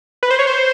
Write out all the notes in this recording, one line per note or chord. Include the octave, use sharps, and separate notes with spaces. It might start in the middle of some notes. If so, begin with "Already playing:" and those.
B4
C5
C#5
C5